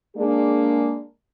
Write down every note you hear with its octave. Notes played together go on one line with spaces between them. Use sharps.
G#3 A#3 D4 G#4